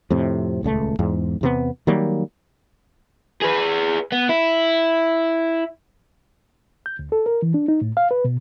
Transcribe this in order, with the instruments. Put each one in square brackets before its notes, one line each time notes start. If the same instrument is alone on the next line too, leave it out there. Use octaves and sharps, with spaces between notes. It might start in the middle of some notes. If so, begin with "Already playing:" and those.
[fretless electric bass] F2 A2 C3
D#1 C#2 C3 A3
E2 G#2
E2 C3 B3
D#3 F#3 G3 A#3
[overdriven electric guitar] G#4 B4
B3
E4
[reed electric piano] G6
D2
A4
A#4
E3
D4
D#4
A2
F5
B4
B2